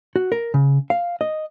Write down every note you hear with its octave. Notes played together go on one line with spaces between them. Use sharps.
F#4
A#4
C#3
F5
D#5